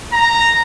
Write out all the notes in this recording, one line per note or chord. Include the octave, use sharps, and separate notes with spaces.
A#5